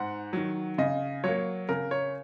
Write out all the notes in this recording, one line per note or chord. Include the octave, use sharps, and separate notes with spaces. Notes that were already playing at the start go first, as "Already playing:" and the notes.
Already playing: G#2 F#5
D#3 F#3
C#3 D#5
F#3 A#3 C#5
C#3 A#4
C#5